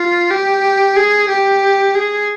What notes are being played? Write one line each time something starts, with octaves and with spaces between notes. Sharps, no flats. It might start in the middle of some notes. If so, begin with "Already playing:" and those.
Already playing: F4
G4
G#4
G4
G#4